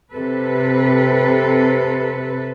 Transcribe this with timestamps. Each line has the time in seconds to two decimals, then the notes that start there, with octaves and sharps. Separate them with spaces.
0.12 C3 A4 B4